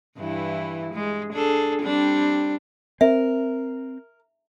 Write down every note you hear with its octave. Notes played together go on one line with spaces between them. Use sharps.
G2 E3 E4
G#3
D4 G#4 A4
G3 C4 D4
C4 A#4 E5